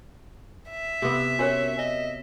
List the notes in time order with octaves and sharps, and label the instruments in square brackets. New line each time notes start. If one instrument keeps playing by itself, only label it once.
[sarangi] E5
[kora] C3 B3
[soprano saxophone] C#4 [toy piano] F#4 A#4 C#5
[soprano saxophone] D#5